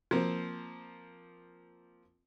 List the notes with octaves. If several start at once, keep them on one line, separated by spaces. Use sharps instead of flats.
F3 A#3 C4